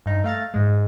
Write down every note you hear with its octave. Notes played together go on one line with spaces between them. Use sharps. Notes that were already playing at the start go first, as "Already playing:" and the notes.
G2 D#4
A3 F5 A#5 A6
G#2 G#3